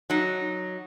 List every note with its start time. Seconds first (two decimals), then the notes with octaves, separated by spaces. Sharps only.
0.10 F#3 D#4